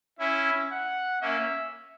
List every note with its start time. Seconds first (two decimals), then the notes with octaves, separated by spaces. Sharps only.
0.19 C#4 E4 E5
0.71 F#5
1.22 A#3 C#4 E5